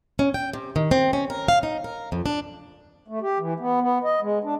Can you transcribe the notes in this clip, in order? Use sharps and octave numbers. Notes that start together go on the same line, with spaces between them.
C#4
G5
C3
D#3
C4
C#4
A#4
F5
D#4
A#4
F2
D4
A3
G4
E3
B3
B3
D#5
G#3
D4